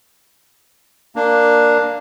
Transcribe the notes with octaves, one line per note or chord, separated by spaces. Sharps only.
A#3 D4